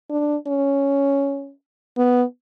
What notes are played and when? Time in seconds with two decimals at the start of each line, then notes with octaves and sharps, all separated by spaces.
0.10 D4
0.47 C#4
1.97 B3